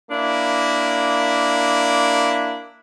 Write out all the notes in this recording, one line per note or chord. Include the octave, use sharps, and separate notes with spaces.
A#3 D4 E4